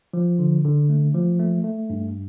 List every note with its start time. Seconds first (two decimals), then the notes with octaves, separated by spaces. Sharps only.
0.13 F3
0.39 D3
0.65 D3
0.89 A3
1.14 F3
1.40 A3
1.64 A3
1.90 G2